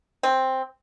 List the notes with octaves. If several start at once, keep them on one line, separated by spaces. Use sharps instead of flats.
C4